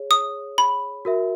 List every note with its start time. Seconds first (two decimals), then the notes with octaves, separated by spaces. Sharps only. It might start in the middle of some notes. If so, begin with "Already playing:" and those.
Already playing: G#4 C#5
0.11 D#6
0.58 B5
1.05 F#4 A#4 E5